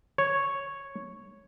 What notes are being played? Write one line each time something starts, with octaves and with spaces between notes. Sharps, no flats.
C#5